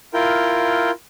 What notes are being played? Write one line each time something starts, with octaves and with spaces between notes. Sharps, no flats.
E4 F4 A#4 G5